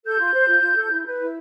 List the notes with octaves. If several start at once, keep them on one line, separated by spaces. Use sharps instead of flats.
A4 G6
F4
C5
F4
F4
A4
E4
B4
E4